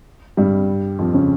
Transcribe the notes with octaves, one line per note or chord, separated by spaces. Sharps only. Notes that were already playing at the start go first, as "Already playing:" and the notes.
G2 G3
F2 F3
C#3 C#4